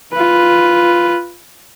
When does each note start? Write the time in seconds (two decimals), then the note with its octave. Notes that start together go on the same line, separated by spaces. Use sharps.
0.13 F4 B4